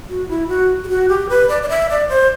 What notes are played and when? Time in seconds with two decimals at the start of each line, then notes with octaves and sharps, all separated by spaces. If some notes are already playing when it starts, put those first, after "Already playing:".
0.09 F#4
0.29 E4
0.48 F#4
0.84 G4
0.88 F#4
1.09 G4
1.29 B4
1.49 D5
1.62 D5
1.69 E5
1.90 D5
2.09 C5